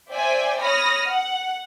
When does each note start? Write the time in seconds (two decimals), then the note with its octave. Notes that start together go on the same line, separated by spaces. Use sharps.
0.12 C5 D5 E5 G5 G#5
0.59 C#5 B5 D#6 F6 A#6
1.07 F#5